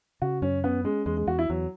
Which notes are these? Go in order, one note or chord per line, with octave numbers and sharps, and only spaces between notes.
C#3 F#4
F#2 C#4
B3 C#4
G#3 C#4
E2 G#3
G#3
E2 F#4
E4
E2 F#3